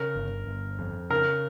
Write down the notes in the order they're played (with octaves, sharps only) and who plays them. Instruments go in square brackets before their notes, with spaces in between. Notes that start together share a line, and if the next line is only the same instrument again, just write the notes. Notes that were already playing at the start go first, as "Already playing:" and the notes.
Already playing: [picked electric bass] C#3 [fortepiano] A#4
[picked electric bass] G1
G1
F2
[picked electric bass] C#3 [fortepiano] A#4